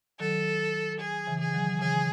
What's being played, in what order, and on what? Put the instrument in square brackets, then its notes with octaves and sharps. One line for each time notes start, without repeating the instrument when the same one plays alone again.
[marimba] D#3 F#3 [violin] A4
[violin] G#4
[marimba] C#3 E3
[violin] G#4
[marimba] D#3 F#3
[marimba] C#3 E3 [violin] G#4